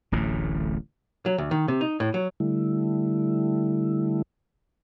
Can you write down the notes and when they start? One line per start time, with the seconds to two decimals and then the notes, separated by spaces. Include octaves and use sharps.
0.12 D1 A1 A2
1.26 F#3
1.38 D2
1.51 D#3
1.68 C3
1.81 D#4
2.00 A2
2.14 F#3
2.40 D3 G3 A3 E4